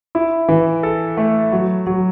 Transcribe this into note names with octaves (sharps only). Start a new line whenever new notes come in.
E4
E3
A4
A3
F#3
F#3